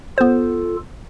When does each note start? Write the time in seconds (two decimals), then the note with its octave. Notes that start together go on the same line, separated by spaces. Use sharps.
0.18 B3 F4 A4 C5